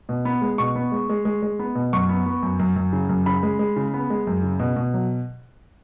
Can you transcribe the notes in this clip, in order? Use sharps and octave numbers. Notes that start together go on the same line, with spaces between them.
B2
B3
G#3
B2 C#6
B3
G#3
G#3
G#3
G#3
B3
B2
F#2 C#6
B3
B3
F#2
F#2
F#2
C#3
F#2
C#3 B5
G#3
G#3
C#3
B3
G#3
F#2
C#3
B2
B2
F#3